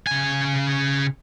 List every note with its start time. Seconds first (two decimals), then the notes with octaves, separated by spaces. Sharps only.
0.07 C#3 G#5